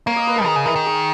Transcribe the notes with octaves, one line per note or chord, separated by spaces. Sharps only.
A#3 C#5
D#5
B4
A#4
D#3 G#4
C#3
E3 A#4
D#3
G#4